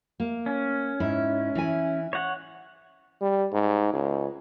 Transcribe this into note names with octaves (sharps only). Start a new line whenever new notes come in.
A#3
C#4
G#2 E4
E3 E4 G#5
C#5 F#5
G3
G#2
C#2